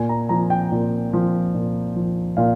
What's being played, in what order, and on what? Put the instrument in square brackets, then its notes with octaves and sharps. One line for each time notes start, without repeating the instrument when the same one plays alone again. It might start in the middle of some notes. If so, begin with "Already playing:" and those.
Already playing: [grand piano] A#2 G#5
A#5
F3 A#5
G5
A#2
F3
A#2
F3
A#2 F5